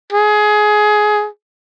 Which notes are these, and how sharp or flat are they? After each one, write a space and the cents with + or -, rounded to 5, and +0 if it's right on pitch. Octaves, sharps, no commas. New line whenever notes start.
G#4 +20